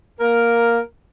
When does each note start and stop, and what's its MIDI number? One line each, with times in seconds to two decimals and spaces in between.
0.20 0.78 58
0.20 0.78 70